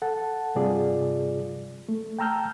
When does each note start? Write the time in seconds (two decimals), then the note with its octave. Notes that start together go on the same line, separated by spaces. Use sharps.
0.02 A4 F#5 A5
0.55 G2 C3 G3 F4 G#4 D5
1.89 A3
2.19 G5 A5 A#5 E6 F6 G6